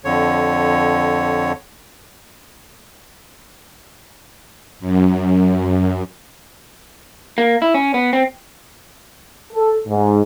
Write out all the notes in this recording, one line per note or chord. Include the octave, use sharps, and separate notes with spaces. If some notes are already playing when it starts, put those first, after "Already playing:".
F2 D3 C#5
F#2
A#3
E4
C#4
B3
C4
A4
G#2